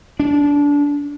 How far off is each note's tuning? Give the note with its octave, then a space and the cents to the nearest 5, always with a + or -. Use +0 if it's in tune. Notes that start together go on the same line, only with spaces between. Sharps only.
D4 -25